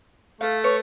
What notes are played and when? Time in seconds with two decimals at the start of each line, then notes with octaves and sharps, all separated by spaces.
0.41 A3 F5
0.64 B4 C#5